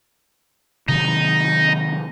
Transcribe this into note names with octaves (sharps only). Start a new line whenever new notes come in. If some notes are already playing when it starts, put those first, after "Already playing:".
C3 D#3 F#3 D#4